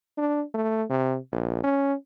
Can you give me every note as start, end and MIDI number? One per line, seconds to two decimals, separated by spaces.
0.17 0.43 62
0.54 0.84 57
0.90 1.17 48
1.32 1.62 34
1.63 1.94 61